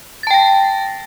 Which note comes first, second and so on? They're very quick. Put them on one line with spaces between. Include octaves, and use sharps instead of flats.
A6 A5 G5 A#6